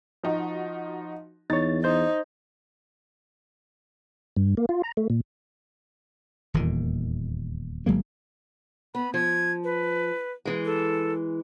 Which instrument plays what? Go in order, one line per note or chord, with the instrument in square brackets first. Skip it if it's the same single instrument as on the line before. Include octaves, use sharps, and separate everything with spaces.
[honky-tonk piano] F3 D#4 F#4
[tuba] E2 [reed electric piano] D#4 C#5 [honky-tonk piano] A6
[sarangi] D#4 [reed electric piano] C5 G6
[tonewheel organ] G2
A#3
F4
A#5
A3
A#2
[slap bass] D#1 E2 A#2 D#3
G1 F#3 G#3 A#3
[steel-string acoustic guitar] B3 [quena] B5
[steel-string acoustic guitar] F3 [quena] G#6
[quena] B4
[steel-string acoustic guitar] E3 G#3
[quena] A4